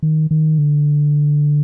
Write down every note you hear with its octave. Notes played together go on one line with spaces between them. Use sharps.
D#3
D#3
D3